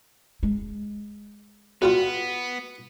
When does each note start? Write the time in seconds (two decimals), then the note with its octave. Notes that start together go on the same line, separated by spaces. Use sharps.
0.43 G#3
1.82 B1 G3 B3 F4 F#4